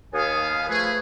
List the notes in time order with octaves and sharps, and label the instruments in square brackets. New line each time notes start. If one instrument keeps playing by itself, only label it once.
[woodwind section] D#2 G#5 D#6 [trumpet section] B3 F5
[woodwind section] F3 A3 B4 [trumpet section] G#4